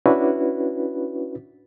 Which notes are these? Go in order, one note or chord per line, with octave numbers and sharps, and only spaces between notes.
C#4 D4 E4 F#4 B4